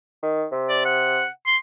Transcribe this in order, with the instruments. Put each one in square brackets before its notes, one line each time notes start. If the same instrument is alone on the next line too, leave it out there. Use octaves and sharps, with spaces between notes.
[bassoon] D#3
C3
[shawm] D5
F#5
C6